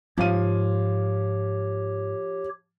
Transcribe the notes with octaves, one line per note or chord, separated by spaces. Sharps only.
G#2 F3 G4 C#5 F5 D#7